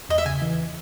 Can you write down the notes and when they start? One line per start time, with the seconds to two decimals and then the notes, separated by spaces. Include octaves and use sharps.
0.09 E2 D#5
0.18 E5
0.26 C#3 G#5
0.42 E3